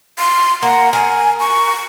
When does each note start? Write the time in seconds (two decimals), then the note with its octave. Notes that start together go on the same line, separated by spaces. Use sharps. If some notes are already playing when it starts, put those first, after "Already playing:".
0.19 C6
0.63 A#3 F#5
0.93 A#4 G#5
1.40 C#6